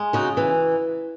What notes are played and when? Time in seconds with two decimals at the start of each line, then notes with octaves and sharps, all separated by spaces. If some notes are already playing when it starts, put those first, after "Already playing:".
Already playing: G#3
0.13 C#3 D#4 F#4
0.37 E3